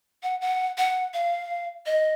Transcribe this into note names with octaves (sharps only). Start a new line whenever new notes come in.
F#5
F#5
F#5
F5
D#5